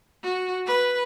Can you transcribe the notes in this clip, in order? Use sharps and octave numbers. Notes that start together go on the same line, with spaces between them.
F#4
B4